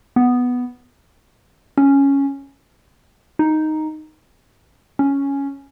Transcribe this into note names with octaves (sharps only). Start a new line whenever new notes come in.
B3
C#4
D#4
C#4